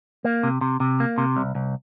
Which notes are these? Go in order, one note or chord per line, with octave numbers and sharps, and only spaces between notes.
A#3
C3
C3
C3
A#3
C3
C2
C2